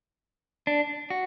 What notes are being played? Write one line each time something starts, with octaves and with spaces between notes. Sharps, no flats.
D4
F#4